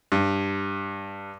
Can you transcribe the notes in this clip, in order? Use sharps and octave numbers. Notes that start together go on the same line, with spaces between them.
G2